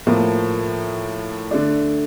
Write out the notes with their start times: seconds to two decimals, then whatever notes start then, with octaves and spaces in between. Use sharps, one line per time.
0.07 A2 F3 A#3
1.51 D3 A3 D4